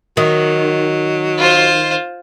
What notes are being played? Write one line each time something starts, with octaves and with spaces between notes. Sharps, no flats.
D#3 F#3
F4 C5